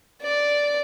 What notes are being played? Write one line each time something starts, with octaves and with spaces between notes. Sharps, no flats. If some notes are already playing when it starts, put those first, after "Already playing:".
D5